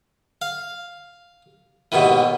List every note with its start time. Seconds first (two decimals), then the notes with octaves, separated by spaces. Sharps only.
0.42 F5
1.92 D#2 G#2 B2 D#3 E3